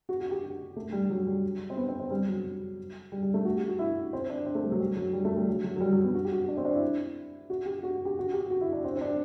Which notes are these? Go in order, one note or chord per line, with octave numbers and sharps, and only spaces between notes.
F#4
F#4
G4
A3
G3
F#3
G3
C4
B3
C4
C4
G3
F#3
G3
G3
A3
F#4
G4
F#4
E4
C4
D4
C4
A3
G3
F#3
G3
F#3
G3
A3
G3
F#3
F#3
F#3
G3
F#3
B3
F#4
G4
F#4
D4
C4
D4
E4
F#4
G4
F#4
G4
F#4
G4
F#4
E4
D4
C4
C4
D4